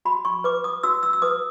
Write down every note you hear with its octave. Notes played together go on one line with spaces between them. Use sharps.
F#4 B5
C#6
B4 D6
D#6
F#4 E6
E6
E6
B4 D#6